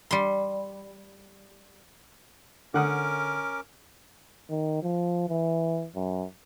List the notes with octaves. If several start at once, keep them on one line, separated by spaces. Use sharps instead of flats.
G3 C6
D3 C#4 A#4 F#5 D6 D#6
D#3
F3
E3
F#2